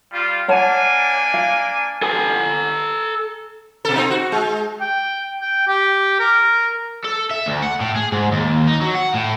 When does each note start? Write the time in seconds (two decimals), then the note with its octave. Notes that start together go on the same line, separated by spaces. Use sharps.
0.12 G3 F4
0.48 A#3 D4 C#5 F#5 G#5 A5
1.34 F5
2.02 A4 G#5
3.85 B2 A4
3.96 C4 D#4
4.10 F#4
4.32 G#3
4.80 G5
5.41 G5
5.67 G4
6.19 A#4
7.04 A4
7.30 E5
7.46 D2
7.62 F#5
7.81 A2
7.96 G#4
8.12 G#2
8.31 D#2
8.67 D#4
8.81 F#3
8.95 F#5
9.14 A2